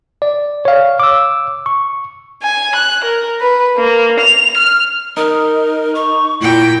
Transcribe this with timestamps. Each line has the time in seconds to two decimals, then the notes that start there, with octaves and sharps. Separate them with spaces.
0.22 D5
0.65 C#5 F5
1.00 D6 E6
1.66 C#6
2.43 G#5
2.76 F#6
3.05 A#4
3.41 B4
3.78 A#3
4.20 F7
4.58 F6
5.17 D#4 A#4
5.95 C#6
6.41 A#2 E4 G5